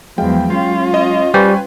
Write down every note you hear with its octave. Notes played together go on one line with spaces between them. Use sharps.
E2 F3 F#3 G#3 F5 G5
C#4 F4
D#5
G3 B4 C5 G5 G#5 C#6